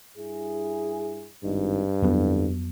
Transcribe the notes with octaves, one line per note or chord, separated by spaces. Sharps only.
G2 E4 G#4
G#1 G2 D#4
C2 F2 D3 F#3 B3